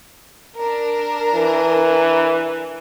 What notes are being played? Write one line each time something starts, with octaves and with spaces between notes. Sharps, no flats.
D4 A#4
E3